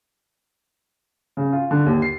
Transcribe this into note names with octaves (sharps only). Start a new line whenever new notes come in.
C#3
F4
D3
D#2
C7